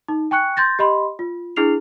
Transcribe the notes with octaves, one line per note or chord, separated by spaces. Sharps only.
D#4
G5 G#5 C#6 F#6 C#7
C6 G6 A6 A#6
G4 D#5 B5 C6
F4
D4 E4 G#4 F6 C7 F7